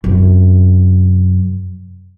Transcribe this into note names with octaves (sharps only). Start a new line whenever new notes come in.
F#2 C3